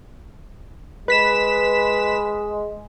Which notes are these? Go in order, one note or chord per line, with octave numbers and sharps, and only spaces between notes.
G#3 B4 B6 E7